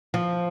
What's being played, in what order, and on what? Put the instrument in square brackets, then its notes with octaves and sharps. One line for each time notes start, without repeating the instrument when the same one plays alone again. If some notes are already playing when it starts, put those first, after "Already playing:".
[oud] F3